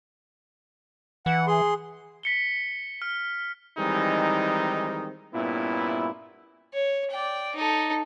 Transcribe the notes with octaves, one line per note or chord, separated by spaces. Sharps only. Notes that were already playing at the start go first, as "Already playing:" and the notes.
E3 F#5
G#4 C6
B6 C#7 G7
F6
D#3 E3 G3 G#3 C4 D#4
G2 A#2 B3 C#4 E4
C#5
D5 G5
D#4 A4